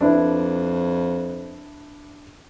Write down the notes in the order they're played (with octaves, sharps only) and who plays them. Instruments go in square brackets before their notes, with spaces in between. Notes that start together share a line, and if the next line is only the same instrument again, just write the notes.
[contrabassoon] F2 [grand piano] D4 E4 B4